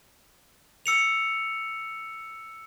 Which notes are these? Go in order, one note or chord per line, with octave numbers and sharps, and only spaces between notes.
E6 C#7 F7